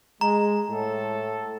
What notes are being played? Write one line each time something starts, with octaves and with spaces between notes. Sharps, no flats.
G#3 A#5
A2 A4